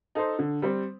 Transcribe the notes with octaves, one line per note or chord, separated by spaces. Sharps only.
D#4 A4 C5
D3
G3 C4